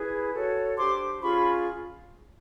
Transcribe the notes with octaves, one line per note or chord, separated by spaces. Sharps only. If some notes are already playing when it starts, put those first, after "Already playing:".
Already playing: E4 G#4 B4
F#4 A4 C#5
D4 G4 C5 C6 D6
C#4 F4 G#4 B5 C#6